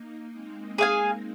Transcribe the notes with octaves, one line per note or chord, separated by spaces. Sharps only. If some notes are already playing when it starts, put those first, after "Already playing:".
Already playing: A#3 D#4
G#3 C4
G#4 F5 G#5